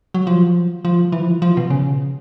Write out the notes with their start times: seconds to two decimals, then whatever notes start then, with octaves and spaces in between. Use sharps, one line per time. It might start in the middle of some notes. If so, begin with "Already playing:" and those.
0.14 F#3
0.27 F3
0.85 F3
1.12 E3
1.21 F3
1.30 E3
1.42 F3
1.57 B2
1.70 C#3